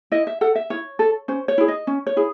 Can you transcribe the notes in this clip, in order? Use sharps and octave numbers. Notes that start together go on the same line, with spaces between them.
E4 D#5
E5
A4 F#5
E5
E4 C#5
A4
C#4 C5
C#5
E4 G#4
D#5
C#4
C#5
E4 G#4